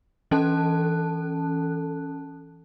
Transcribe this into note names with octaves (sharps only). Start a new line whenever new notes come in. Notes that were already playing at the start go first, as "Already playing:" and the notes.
E3 C#4 A4 A5 F#6